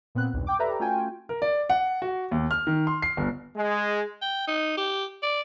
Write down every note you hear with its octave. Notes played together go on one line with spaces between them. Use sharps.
A#2 B3 C4 F#6
B1 E2 G2
G5 D6
G4 A4 B4 D5 E5 A#5
A3 C#4 F4 F#4 G5 G#5
A#4
D5
F#5
F#4
D#2
F6
D#3
C6
C7
G1
G#3
G5
D#4
G4
D5